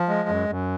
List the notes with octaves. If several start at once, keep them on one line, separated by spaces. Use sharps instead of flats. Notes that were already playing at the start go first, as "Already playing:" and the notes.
Already playing: F3
G#3
F#2
F#2